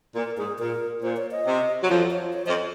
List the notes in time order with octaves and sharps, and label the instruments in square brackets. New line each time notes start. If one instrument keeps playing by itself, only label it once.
[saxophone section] A#2 [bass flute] A#4
[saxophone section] G#2 [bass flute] G#4
[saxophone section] A#2 [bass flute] A#4
[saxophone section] A#2 [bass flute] C5
[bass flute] C#5
D#5
[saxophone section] C3
F#3
[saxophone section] F2 F3 [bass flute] C#5
[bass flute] C#5
C#5
[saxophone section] F2 F3 [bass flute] D#5